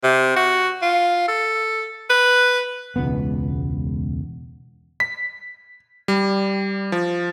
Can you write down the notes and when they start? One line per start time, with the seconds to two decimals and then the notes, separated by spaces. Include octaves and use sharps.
0.03 C3
0.36 F#4
0.82 F4
1.28 A4
2.10 B4
2.96 E1 C#2 B3
5.00 B6
6.08 G3
6.92 F3